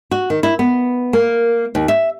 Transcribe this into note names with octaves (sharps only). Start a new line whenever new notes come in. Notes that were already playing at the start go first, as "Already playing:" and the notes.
F#4
D#3
E4
B3
A#3
D#2
E5